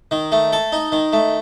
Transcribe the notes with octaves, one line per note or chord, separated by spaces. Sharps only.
D#3
A3
A4
D#4
D#3
A3